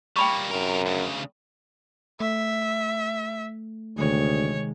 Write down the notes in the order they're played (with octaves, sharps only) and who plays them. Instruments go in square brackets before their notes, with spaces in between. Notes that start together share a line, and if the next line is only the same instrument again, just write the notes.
[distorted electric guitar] G3 A#3 [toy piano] G5 B5 C#6
[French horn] F#2 [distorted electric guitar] C3 A#4
[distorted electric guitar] D2 C#3
[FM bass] A3 [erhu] E5
[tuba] D2 [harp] C3 D#3 G#3 [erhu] C#5